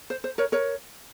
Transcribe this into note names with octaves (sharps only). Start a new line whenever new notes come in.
C5
C5
A#4 C#5
A#4 C#5